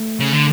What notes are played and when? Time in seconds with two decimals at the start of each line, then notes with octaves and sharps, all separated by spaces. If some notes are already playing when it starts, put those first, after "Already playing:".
Already playing: A3
0.20 C#3
0.32 D3